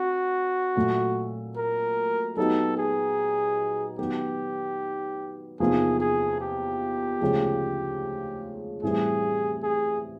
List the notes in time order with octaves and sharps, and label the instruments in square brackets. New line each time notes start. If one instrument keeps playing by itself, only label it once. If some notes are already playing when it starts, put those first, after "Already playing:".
Already playing: [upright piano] C4 [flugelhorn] F#4
[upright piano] A#2 F#3 A3
[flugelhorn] A#4
[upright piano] F#3 B3 D#4 G4 [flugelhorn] A4
[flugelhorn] G#4
[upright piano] D#3 F#3 B3 [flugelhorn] G4
[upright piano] E2 C3 F3 A#3 D#4 [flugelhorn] G#4
[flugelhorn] G#4
G4
[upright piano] D2 C#3 F3 G#3
[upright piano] A2 E3 G3 C4 [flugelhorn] G#4
[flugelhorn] G#4